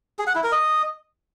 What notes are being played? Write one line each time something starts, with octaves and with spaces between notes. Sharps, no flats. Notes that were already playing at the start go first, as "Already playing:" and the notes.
G#4
F#5
E4
A#4
D#5